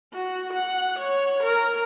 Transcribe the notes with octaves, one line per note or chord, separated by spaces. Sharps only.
F#4
F#5
C#5
A#4